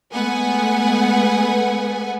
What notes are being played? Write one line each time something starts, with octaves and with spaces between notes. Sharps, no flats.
G#3 A3 B3 B4 F#5 G#5